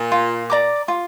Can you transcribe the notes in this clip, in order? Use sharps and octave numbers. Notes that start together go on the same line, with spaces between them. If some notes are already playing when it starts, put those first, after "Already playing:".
Already playing: A#2
F4
D5 A#5 D6
F4